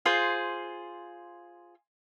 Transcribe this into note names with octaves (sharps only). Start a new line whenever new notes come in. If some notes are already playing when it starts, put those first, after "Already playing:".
F4 G#4 C5